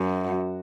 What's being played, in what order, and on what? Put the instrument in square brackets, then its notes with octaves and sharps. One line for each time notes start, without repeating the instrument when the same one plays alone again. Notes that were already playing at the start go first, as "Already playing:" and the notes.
Already playing: [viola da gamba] F#2 [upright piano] F#4